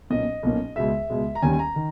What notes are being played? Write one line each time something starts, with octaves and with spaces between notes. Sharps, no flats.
B1 A#2 A#3 C#4 D#5
B1 A#2 A#3 C#4
C#2 B2 G#3 E5
C#2 B2 G#3
A#5
D#2 D#3 G3 C#4 G#5
G#5
A#5
D#3